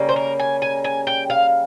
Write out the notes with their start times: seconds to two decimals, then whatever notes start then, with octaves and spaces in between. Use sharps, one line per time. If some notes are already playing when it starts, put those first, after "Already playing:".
Already playing: C#3 G3 A#3 C#4
0.09 C5
0.16 A#4
0.40 G#5
0.62 G#5
0.84 G#5
1.07 G5
1.30 F5